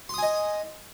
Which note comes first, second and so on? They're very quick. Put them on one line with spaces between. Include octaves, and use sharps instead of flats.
C6 D#6 G#5 D#5